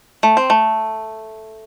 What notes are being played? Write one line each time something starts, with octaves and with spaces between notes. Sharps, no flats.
A3
C4
A3